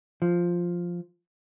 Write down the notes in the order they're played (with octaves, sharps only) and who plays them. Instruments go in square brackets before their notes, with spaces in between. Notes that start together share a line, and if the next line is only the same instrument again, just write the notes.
[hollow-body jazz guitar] F3